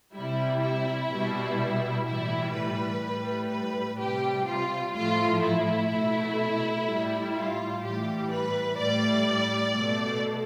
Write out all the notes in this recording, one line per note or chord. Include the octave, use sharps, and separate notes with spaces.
C3 G3 E4
E4
B2 G3
A2 E3 G3 E4
B4
A2 G3
B4
C3 G3 G4
F4
A2 F3 A3 F4
E4
B2 A3
A2 G3
F4
A2 E3 G3 G4
B4
A2 G3 D5
B2 A3